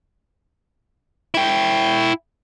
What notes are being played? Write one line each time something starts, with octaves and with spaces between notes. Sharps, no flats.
E4 G5